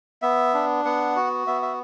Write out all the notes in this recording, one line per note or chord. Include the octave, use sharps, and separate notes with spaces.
B3 E5
D4
B3 F#5
F#4
B3 E5
E5